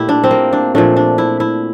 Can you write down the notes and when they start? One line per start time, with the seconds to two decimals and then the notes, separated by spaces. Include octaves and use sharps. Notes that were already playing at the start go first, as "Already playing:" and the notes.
Already playing: A#2 A3 E4 G4
0.09 D4
0.24 C4
0.31 A#3
0.53 D4
0.75 A#2 F3 A3 D4
0.96 D4
1.18 E4
1.40 E4